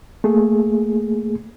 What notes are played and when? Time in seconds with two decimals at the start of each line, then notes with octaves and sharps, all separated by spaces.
0.24 A3 A#3 G#4